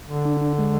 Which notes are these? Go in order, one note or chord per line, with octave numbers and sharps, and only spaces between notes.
D3
D4
D4
G#3